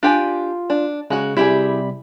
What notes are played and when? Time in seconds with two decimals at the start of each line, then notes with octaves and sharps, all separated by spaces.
0.03 D4 F4 G4 G#5
0.70 D4
1.10 C#3 G#3 F#4 F#6
1.37 C3 G3 E4 G4 G#4 B5